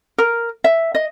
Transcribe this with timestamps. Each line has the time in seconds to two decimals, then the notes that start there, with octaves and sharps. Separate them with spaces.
0.18 A#4
0.64 E5
0.95 D#5